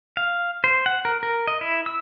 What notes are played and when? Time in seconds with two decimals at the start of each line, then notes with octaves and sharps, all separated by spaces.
0.17 F5
0.64 C5
0.86 F#5
1.05 A#4
1.23 A#4
1.47 D#5
1.61 E4
1.86 E6